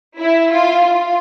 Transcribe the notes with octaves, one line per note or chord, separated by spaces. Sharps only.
E4
F4
F4